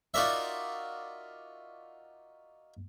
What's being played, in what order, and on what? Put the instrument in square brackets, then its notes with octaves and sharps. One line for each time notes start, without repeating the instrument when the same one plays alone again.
[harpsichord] D#4 F4 F#4 A#4 D5 E5